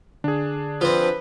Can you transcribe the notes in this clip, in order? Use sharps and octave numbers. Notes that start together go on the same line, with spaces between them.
D3 D4 G#4
F3 C4 B4